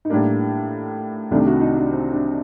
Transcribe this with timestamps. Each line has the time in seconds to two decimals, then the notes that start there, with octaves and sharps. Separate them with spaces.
0.05 D#4
0.10 A2 G3 A#3 D4
1.31 C2 C3 D#3 A3 D4
1.47 F#4
1.61 D#4
1.77 D4
1.91 C4
2.12 D4